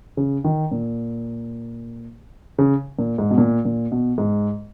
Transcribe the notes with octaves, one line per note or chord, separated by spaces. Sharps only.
C#3
D#3
A#2
C#3
A#2
G#2
B2
A#2
A#2
B2
G#2